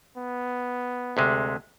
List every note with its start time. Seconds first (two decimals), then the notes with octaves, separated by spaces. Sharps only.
0.17 B3
1.17 D2 C3 G#3